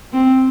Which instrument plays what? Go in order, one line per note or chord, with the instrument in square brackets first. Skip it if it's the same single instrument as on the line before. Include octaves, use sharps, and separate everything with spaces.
[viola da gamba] C4